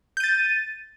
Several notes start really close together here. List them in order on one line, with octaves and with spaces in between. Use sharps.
G6 D#7 A6